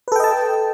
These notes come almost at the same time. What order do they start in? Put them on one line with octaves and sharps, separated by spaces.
B4 A4 G5 D#5 A5